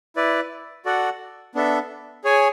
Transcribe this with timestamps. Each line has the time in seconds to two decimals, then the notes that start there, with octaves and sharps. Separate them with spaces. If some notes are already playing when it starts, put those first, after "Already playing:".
0.16 E4 B4 D5
0.85 F#4 A4 D5 F#5
1.55 B3 D4 A4 E5
2.24 G#4 C#5 G#5